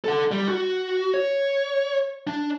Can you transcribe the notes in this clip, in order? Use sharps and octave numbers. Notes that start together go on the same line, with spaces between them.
A4 F#5
G3
F#4
C#5
D4